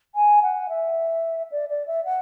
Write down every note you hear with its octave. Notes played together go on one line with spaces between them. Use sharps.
G#5
F#5
E5
D5
D5
E5
F#5